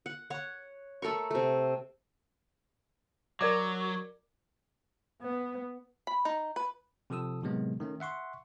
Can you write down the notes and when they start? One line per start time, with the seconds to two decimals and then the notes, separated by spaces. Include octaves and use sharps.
0.06 F#5
0.30 C#5 F#5
1.02 A3 A4 A#4 C#6
1.31 C3 A3
3.41 F#3 A#4 D5 D6
5.22 B3
6.07 B5
6.25 D#4
6.56 B4
7.10 C3 F3 A4 D#6 E6
7.42 A2 C3 D#3 F#3 G#3 B3
7.80 D#3 A3 C#4
8.00 E5 F#5 C6 C#6